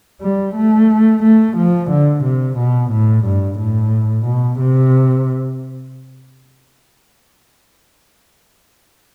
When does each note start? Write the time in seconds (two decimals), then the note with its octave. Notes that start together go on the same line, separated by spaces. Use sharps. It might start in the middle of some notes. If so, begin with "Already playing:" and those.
0.22 G3
0.55 A3
1.23 A3
1.57 F3
1.91 D3
2.24 C3
2.58 B2
2.92 A2
3.25 G2
3.59 A2
4.26 B2
4.60 C3